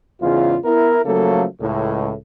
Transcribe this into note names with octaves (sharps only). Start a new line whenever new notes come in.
E2 G#2 C#3 F4
B3 E4 A#4
C#3 F3 F#3 A3 A#3 A4
C#2 A2